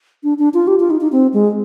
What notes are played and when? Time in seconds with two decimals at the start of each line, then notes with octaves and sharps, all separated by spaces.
0.24 D4
0.39 D4
0.54 F4
0.68 G4
0.80 F4
0.90 D#4
1.01 D#4
1.12 C4
1.33 G#3